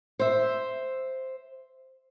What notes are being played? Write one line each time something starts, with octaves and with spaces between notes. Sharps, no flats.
C5 E5